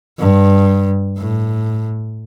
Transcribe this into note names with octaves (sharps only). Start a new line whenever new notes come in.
G2
A2